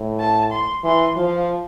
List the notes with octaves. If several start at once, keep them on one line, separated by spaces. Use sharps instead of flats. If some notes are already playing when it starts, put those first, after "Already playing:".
Already playing: A2
A5
C6
E3 C6
F3 F5